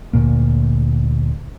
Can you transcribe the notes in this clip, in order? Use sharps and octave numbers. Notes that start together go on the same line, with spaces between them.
D2 A#2 A#3